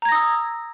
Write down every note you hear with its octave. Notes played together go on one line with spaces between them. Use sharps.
A#5 D#6 E6 G#6 A#6